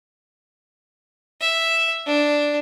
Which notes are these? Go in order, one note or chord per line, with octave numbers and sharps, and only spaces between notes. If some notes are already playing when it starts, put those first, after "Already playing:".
E5
D4